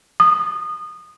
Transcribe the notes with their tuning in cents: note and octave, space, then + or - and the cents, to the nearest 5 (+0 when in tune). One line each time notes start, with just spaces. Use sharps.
D#6 -25